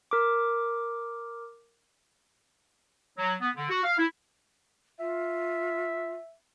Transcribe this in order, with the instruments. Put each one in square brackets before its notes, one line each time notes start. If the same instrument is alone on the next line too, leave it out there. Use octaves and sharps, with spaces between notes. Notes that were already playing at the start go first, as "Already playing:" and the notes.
[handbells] A#4 D6
[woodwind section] F#3
B3
D3
F#4
F5
E4
[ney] F4 [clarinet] E5